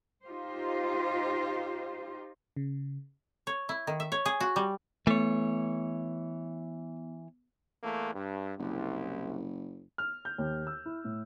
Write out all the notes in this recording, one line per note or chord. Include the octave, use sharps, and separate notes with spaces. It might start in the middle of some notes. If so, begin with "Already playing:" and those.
D#4 F4 G4 C5
C#3
C#5
E4
D#3
E5
C#5
G#4
F#4
G3
E3 A3 B3 C#5
E2 A3 A#3
G2
F#1 C2
F6
G6
D#2
E6
E4
A2